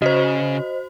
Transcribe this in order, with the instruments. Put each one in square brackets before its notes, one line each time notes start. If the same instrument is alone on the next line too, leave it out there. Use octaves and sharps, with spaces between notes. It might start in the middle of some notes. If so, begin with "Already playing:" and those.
[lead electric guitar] C#3 [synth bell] F#4 C5 [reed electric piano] D#5